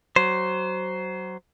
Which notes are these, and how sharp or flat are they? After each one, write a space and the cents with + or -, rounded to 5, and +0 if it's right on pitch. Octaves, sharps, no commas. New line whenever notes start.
F#3 +20 C5 +0